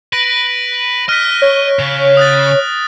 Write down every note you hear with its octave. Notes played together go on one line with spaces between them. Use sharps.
B4 A#6 D7
D#5 F6 F#6 B6
C#5
C#3
D#6 F#6 A6